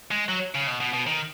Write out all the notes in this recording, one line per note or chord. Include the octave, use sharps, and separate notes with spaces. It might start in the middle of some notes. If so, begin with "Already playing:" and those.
G#3
F#3
C#3
B2
B2
B2
D#3